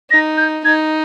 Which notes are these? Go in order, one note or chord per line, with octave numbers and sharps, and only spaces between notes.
D#4 A#6
G6
D#4 G#6